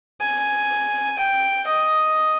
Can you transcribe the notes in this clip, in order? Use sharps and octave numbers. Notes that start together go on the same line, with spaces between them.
G#5
G5
D#5